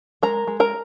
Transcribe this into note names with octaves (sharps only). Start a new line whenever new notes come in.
G#3 A#4 A#5
G#3
A#4 A#5